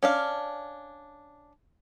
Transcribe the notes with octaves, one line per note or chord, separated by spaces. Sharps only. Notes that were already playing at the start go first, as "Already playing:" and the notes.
C#4 D4 F5